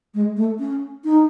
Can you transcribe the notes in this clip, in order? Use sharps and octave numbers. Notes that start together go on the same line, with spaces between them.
G#3
A3
C#4
D#4